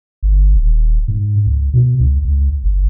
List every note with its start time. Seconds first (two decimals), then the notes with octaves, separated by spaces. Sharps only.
0.23 G1
0.54 D#1
1.08 G#2
1.46 C#2
1.74 B2
2.00 C#2
2.25 C#2
2.64 F#1